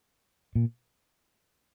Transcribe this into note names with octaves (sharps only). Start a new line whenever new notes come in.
A#2